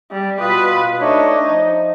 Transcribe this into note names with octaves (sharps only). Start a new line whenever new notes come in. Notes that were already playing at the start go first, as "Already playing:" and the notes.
G3
B2 F4 B4 D#6
A3 D4 D#4 C#5
F3